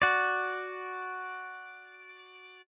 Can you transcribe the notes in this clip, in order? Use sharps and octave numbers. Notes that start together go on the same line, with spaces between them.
F#4 D5